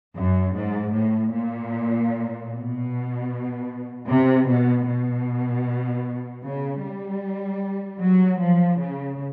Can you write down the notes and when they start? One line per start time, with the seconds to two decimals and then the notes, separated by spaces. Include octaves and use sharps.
0.16 F#2
0.55 G#2
0.94 A2
1.34 A#2
2.51 B2
4.08 C3
4.48 B2
4.87 B2
6.45 C#3
6.83 G3
8.00 F#3
8.40 F3
8.80 C#3